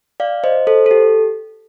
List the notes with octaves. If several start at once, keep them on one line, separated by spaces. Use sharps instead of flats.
D5 F5
C5 D#5
A4 C5
A4
G4